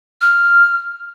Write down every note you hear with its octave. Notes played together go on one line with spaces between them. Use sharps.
F6